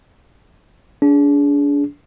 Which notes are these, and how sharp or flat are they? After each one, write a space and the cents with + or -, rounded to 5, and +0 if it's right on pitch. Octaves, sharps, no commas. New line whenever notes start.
D4 -35 G#4 +10